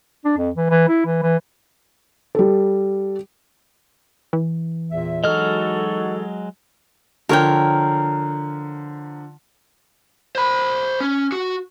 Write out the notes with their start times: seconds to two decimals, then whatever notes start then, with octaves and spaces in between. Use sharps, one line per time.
0.25 D4
0.37 F2
0.56 E3
0.70 E3
0.88 E4
1.05 E3
1.23 E3
2.35 G3 A4
4.33 E3
4.90 E2 A#2 E5
5.24 F#3 G#3 D#4 F#4 A4 D#5 F6
7.29 D3 F3 A#4 C#5 G5 F6
10.35 C5 B5
11.00 C#4
11.32 F#4